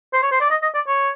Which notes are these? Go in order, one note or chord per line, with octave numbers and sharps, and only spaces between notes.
C5
C#5
C5
D5
D#5
D#5
D5
C#5